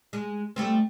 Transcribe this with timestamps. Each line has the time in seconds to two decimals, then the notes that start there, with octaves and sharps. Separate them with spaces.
0.13 G#3
0.56 G3 A3 C4